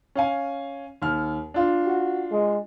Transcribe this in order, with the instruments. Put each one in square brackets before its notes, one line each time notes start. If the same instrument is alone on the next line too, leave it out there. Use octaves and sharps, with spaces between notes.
[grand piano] C#4 F5 G#5
D#2 F6
D4 F4
[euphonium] F#4
G#3